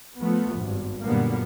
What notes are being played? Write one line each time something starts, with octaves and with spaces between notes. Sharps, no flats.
F3 A3 B3
G#1 G2
F#2 A#2 D3 G3 A#3 B3